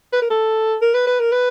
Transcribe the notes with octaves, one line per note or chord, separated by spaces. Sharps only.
B4
A#4
A4
A#4
B4
B4
A#4
B4